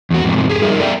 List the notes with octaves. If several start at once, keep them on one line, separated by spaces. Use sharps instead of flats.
E2 F#4
F2 G#2 C3
G4 G#4
G2 G3 D#4 G#4 A#4 E5
A4 D5 E5 G5